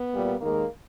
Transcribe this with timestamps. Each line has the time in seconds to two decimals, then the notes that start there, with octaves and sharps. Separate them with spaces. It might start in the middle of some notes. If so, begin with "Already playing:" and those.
Already playing: B3
0.11 A#2 G3 A#3
0.41 D#2 D#3 G#3 A#3